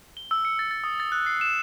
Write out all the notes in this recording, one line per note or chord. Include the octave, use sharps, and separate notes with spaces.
G7
E6
C#7
A6
A6
D#6
A6
F#6
C7
E7